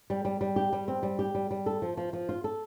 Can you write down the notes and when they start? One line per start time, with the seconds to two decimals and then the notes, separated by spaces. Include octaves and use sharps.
0.10 G3
0.25 G3
0.41 G3
0.56 G4
0.73 G3
0.88 C4
1.03 G3
1.19 G4
1.35 G3
1.51 G3
1.66 A4
1.82 F3
1.97 F3
2.13 F3
2.29 F4
2.44 A4